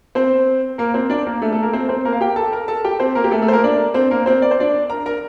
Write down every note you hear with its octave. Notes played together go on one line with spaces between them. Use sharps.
C4 C5
A#3 A#4
C4 C5
D4 D5
A#3 A#4
A3 A4
A3 A4
A#3 A#4
C4 C5
C4 C5
A#3 A#4
F5
G4 G5
A4 A5
A#4 A#5
A4 A5
G4 G5
C4 C5
A#3 A#4
G4
A3 A4
A3 A4
C5
A#3 A#4
D4 D5
C4 C5
A#3 A#4
C4 C5
D5
C5
D4 D5
A#4 A#5
A#4 A#5